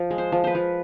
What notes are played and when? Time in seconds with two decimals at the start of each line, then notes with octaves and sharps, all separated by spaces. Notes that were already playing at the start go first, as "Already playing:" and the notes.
Already playing: F3
0.11 G#3
0.18 C5
0.32 F3
0.44 B4 C5
0.55 F3